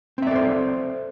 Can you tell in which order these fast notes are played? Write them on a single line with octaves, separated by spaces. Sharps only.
C4 E5 D5 A4 C5